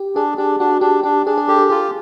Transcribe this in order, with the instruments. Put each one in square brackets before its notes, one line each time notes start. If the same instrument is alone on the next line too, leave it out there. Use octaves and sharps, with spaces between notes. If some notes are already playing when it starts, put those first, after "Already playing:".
Already playing: [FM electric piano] G4
[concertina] D4 [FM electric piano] G#4
[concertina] D4 [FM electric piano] G4
[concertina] D4 [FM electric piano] F#4
[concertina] D4 [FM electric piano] G4
[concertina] D4 [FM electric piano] G4
[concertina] D4 [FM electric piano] G#4
[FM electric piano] G#4
[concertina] G4 [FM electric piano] A4
[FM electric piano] A4
[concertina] F4 [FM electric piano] G#4